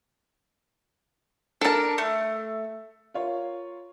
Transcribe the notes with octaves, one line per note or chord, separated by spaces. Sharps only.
D4 A4 A#4 A5
A3
F4 A#4 C#5 F5